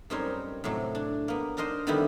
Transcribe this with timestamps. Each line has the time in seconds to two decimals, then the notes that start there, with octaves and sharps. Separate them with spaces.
0.10 F#2 G3 C4 D#4 A#4 C#5
0.64 A2 C3 F#3 A3
0.95 D4
1.28 A#3 B3
1.57 D4 D#4 A#4 C5 D#5
1.87 D3 D#3 G3 B3 C4 E4